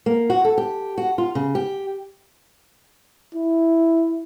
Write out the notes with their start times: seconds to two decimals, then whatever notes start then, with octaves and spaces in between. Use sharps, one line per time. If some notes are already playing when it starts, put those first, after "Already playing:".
0.06 A#3
0.30 F#4
0.45 A4
0.58 G4
0.98 F#4
1.18 F4
1.35 C#3
1.55 G4
3.35 E4